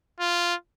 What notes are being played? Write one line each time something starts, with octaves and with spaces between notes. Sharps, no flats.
F4